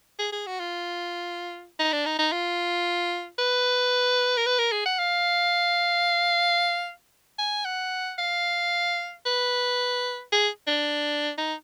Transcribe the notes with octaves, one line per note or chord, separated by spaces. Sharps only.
G#4
G#4
F#4
F4
D#4
D4
D#4
D#4
F4
B4
A#4
B4
A#4
G#4
F#5
F5
G#5
F#5
F5
B4
G#4
D4
D#4